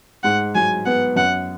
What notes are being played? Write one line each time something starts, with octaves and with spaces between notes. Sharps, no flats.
G#2 F#5
F#3 G#5
B3 F#5
F#2 F#5